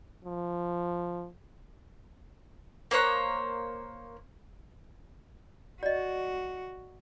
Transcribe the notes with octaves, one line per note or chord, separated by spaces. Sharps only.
F3
A#3 C5 C#5 F#6
F#4 D5 D#5